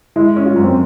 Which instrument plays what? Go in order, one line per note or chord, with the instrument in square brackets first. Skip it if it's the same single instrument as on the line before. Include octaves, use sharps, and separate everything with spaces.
[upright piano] G#3 [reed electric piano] E4
[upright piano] C#4
[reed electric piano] F4
[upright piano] F#2
[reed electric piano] C4